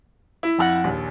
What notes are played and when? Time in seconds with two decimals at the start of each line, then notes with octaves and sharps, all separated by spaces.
0.43 E4
0.58 F2 G#4 F#5
0.84 A#1 D#2